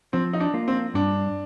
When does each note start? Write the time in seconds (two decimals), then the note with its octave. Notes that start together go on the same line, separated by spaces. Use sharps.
0.13 F3 C4
0.33 D#4
0.40 D4
0.54 A#3 F4
0.68 C4
0.94 G2 D4